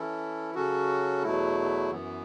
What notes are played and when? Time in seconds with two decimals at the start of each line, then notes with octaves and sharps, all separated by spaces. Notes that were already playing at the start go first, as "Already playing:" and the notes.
Already playing: E3 C#4 E4 A4
0.55 C#3 F#3 C#4 F#4 A4
1.23 E2 B2 F#3 A3 E4
1.91 F#2 E3 B3